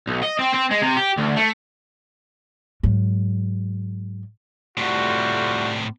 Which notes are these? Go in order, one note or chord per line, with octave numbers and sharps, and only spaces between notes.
B1
D#5
C4
C4
G#3
C3
G4
D2
A3
G#2 F#3
A2 C3 G3 A3 F4 F#4